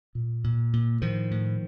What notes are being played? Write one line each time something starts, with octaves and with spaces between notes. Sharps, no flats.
A#2
A#2
A#2
A2 D#3 F3
A2